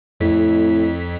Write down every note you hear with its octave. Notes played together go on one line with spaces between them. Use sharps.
F2 A2 B6